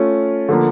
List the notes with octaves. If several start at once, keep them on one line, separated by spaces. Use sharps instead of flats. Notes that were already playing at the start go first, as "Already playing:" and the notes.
Already playing: A3 C#4 F4
D3 F3 A#3